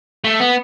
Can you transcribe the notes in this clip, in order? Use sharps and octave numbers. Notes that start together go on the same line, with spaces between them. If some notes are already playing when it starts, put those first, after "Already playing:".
A3
B3